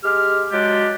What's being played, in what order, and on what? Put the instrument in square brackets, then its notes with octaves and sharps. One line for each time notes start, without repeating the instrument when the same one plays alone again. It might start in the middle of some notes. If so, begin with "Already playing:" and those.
[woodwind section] G#3 G4 F6
F#3 G#3 D4 F4 G4